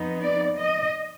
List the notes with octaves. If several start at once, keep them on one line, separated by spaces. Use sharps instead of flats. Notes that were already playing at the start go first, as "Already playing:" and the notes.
Already playing: F2 F3 B3 D#4
D5
D#5